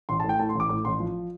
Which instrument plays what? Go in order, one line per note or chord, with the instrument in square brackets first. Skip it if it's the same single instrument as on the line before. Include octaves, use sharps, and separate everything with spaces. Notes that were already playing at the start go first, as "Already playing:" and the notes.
[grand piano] A1 C6
A5
A2
G5
A2 A5
C6
A1 D6
A2 D6
A1 C6
F3